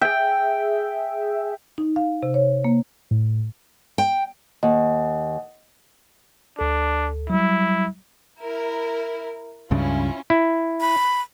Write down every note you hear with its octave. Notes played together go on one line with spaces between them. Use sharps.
G#4 E5 G5
D#4
F5
C3
C#5
A#3
A2
G5
D#2 D#5 F#5
D2 D4 A4
F#3 G3 E4
E4 A#4
C#2 G2 C#3 C#4 E4 F4
E4
B5